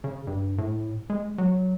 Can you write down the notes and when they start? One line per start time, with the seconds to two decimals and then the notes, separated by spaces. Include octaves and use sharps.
0.04 C#3
0.27 G2
0.58 A2
1.10 G#3
1.38 F#3